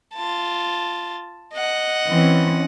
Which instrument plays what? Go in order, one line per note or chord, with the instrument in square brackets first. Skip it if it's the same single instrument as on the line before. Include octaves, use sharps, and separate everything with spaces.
[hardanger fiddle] F4 A5
D#5 F#5
[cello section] E3 C4 C#4